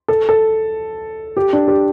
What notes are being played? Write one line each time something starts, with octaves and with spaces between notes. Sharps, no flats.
A4
A4
G4
D4
G4